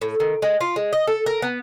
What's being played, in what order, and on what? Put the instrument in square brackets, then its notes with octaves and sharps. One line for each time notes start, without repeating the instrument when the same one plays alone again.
[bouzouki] A2
D#3
G#3
F4
G#3
D#5
A4
A#4
B3